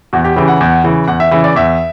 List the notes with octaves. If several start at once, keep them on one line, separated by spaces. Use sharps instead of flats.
E2 F#4
G4
C#3 E3 G4
F#5
E2
C#3 E3
E2 F#5
E5
C#3 E3 E5
D5
E2 E5